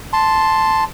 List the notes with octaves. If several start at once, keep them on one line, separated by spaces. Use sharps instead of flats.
A5 C6